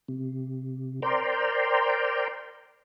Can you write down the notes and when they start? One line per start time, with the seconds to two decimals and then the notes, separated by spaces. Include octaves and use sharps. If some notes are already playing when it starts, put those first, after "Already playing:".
0.08 C3
1.02 A#4 C5 D5 G5 A#5 C6